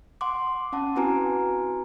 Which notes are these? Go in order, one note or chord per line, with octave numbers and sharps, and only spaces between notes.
F#5 C6 D6
C#4 F#5 A5
C4 E4 F#4 B4 G#5 A#5